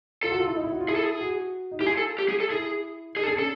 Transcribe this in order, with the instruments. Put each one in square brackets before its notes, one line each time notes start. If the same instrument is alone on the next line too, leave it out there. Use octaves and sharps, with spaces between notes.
[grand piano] F4 [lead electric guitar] A4
[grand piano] F#4
F4
E4
D#4
E4
F#4
F4
[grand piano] E4 [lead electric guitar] G#4
[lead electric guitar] A4
G#4
[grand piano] F#4
D#4
[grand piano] E4 [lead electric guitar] G4
[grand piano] F4 [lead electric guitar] G#4
[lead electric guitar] A4
G4
G#4
A4
[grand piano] E4 [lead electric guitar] G#4
[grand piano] D#4 [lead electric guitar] G#4
[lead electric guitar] A4
[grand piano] D4 [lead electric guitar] G#4
[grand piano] C#4 [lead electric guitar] A4